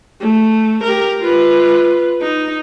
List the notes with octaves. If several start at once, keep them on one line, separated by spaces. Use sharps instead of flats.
A3
G4 A#4
F4 B4
D#4